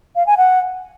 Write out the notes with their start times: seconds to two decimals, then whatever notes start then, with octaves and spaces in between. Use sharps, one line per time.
0.16 F5
0.27 G#5
0.37 F#5